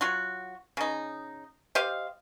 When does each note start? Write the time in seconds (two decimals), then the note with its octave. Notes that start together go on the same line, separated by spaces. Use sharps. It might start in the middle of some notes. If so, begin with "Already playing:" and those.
0.01 F#3 F4 F#4
0.77 C#3 D#4
1.75 G4 C5 D#5 F5